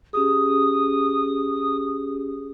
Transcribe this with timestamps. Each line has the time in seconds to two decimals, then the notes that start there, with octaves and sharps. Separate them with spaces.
0.13 C#4 G4 G#4 D#6